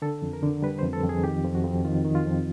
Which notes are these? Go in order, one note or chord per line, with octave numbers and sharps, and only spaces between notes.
D3 A4
F2
A#4
D3
G3 B4
F2 C5
A4
F2
G#4
D#3 G4
F2
F#4
F2
D#3 F4
D#3
F4
F2